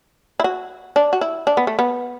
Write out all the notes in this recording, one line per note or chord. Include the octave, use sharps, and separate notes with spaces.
E4
F#4
D4
F#4
E4
D4
B3
A3
B3